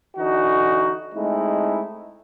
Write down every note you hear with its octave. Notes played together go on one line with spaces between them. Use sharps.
D3 E3 D#4 F#4
G#3 A3 C4 D#4 E4